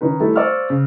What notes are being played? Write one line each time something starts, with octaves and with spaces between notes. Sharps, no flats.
D#3 C#4 D#4 B4
G3 A3 E4 A4
C5 D5 F5 C#6 E6 F6
C#3